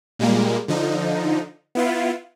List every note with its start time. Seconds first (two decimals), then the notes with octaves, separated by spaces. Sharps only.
0.19 A#2 G3 G#3 A#3
0.68 D3 F3 D#4
1.75 B3 E4 F4